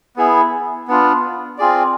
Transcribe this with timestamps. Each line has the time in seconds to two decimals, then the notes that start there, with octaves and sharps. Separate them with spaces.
0.16 B3 E4 G#4
0.88 B3 D4 F4
1.58 C4 F4 G#4 D5